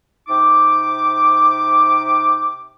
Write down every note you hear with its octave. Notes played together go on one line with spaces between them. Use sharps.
C3 D#4 D6